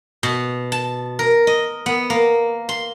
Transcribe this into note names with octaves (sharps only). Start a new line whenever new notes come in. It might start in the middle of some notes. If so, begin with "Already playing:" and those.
B2
A5
A#4
D#5
B3
A#3
C6